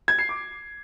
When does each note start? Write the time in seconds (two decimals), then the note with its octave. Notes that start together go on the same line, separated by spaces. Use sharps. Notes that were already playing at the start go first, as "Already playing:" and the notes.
0.08 G#6
0.19 C7
0.29 D6